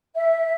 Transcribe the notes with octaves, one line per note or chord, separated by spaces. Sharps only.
E5